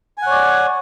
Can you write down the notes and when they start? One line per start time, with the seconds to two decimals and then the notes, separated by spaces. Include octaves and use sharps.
0.18 G#5
0.22 F#5
0.26 C#5
0.31 D5